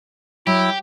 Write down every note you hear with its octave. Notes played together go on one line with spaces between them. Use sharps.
F#3 E4 G4